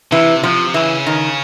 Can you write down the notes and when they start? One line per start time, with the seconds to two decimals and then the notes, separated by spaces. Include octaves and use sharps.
0.12 C3 E3
0.43 C3 F3
0.74 C#3 E3
1.06 D#3